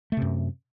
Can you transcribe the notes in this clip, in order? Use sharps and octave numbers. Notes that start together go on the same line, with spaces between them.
F#2 C3 A3